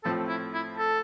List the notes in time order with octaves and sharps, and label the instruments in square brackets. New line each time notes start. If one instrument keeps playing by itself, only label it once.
[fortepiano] A2 F3 A3 C4 [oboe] A4
[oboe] E4
E4
A4